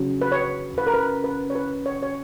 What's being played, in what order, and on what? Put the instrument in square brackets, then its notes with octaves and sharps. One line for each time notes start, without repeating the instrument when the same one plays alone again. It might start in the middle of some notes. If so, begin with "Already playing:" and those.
Already playing: [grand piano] C#3 F#3
[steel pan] B4
C#5
B4
A#4
B4
B4
C#5
B4
C#5
C#5